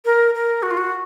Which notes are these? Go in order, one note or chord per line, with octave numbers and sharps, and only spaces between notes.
A#4
A#4
F#4
F4
F#4